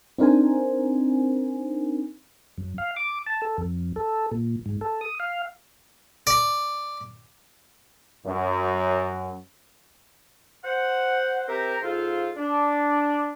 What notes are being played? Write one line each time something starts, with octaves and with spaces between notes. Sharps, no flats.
C4 D4 D#4 A#4 C5 G#5
F#2
F5
D6
A5
A4
F2
A4
A#2
G#2
A4
D#6
F5
D5
F#2
C5 F#5
C4 G4 A#4 E5 G5 A#5
G#2 F4 A4 C5 F5
D4